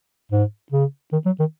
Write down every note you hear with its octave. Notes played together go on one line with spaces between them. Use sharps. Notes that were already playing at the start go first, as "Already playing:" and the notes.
G#2
C#3
D#3
F#3
D#3